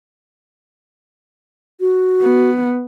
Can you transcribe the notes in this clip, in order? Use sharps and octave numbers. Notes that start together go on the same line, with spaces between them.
F#4
B3